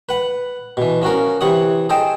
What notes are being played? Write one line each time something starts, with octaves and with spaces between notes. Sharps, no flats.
B4 F#5
B2 E3
F3 C#4 F#4 A#4
C3 E3 C#5 F#5 D#6
G#4 A4 C5 D#5 G5